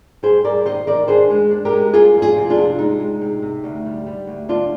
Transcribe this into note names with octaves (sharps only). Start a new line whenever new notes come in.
G3 G#4 C5
G3 A#4 D5
D#3 C5 D#5
D#3 A#4 D5
D4 G#4 C5
G#3
D4
G4 A#4
G#3
G3 F4 G#4
F2
F4 G#4
C3
D4 F4
C3
G#3 D#4
G#3
C3
C3
D2
G3
G3
D2
C4 D4 F4